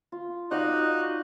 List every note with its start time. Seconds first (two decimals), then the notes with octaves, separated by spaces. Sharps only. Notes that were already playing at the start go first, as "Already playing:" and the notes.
0.12 F4
0.51 D#4 F#4 D5 D#5 F5 F#6